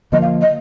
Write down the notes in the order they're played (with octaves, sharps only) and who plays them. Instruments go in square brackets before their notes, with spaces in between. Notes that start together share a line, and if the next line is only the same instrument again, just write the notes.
[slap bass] D3 F3 A#3 [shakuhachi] D#5
[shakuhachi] F5
D#5